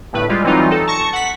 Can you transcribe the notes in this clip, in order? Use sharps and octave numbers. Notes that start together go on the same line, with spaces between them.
G1 A2 B4
G3 G#3 F4
E3 F#3 G3 C4 D#4 F4
D#4 A4
A5 C#6 A#6 C#7
F#5 B6